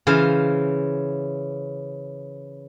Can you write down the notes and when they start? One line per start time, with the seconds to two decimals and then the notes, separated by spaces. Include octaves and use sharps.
0.07 C#3 E3 C5 F5